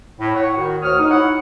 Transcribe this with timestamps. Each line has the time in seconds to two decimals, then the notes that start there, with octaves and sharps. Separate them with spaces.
0.20 A2
0.35 C#5 F#5
0.56 D#3 F#4
0.82 D2 C#5 D#6 F6
0.99 D#4
1.11 E4 C#5 F#5